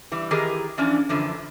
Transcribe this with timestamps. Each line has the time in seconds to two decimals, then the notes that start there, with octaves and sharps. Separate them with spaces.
0.12 E3 G3
0.31 D#3 E3 G4 G#4 A#4
0.78 E3 F3 C#4 D4
1.09 F#2 D3 E3 F3